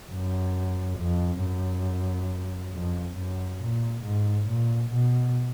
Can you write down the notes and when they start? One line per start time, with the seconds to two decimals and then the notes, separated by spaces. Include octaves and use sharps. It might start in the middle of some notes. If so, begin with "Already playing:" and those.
0.12 F#2
0.99 F2
1.43 F#2
2.73 F2
3.16 F#2
3.61 A#2
4.04 G#2
4.48 A#2
4.91 B2